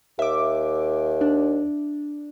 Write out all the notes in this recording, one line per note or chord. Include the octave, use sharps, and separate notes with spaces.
D#2 E5 D6
D4